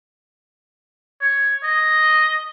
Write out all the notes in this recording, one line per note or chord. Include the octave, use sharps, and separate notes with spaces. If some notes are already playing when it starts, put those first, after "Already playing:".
C#5
D#5